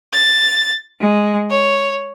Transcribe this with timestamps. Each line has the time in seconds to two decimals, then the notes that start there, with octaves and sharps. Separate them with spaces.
0.13 A6
1.01 G#3
1.50 C#5